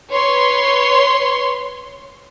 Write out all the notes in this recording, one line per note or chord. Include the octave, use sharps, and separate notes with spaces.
B4 C#5 C6